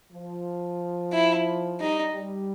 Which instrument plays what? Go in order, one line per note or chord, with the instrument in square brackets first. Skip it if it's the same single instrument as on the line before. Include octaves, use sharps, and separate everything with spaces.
[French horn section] F3
[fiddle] E4
[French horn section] G3 [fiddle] D#4
[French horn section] G3